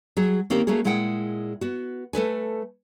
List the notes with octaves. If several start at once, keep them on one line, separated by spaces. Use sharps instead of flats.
F#3 G#4
D#3 A#3 C4 C#4 G4
A3 A#3 C#4 F#4 G#4
A#2 G#3 E4 G#4 F#5 G5
B3 F#4
A3 A4 B4 G#5